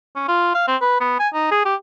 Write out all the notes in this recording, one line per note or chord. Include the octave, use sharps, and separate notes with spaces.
C#4
F4
F5
C4
B4
B3
G#5
D#4
G#4
G4